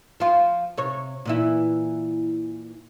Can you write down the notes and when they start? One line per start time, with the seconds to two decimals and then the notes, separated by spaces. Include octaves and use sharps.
0.20 F3 F4
0.77 C3 C#5
1.25 A#2 E3 E4